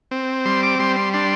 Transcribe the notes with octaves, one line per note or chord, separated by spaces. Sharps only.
C4
G3 C6
D6
G3 C6
C6
D4 C6